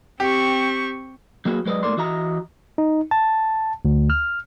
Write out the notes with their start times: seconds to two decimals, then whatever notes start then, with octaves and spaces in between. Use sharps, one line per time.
0.20 C4 G4 C#6
1.45 F#3 A#3 F#4 G#4 B4
1.66 F#3 G#3 B4 D5 D#5
1.83 G#2 A3 A#3 D5 C6
1.97 E3 F#4 D#5 E5 A#5
2.78 D#4
3.11 A5
3.85 D2
4.10 F6